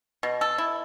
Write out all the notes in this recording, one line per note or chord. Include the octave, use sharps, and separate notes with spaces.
B2
A4
E4